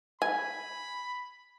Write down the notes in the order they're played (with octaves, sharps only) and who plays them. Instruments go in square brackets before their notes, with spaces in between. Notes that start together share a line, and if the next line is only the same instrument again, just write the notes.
[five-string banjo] G#5 [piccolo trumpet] B5